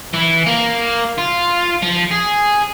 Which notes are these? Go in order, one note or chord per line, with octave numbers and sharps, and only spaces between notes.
E3
A#3
F4
F3
G#4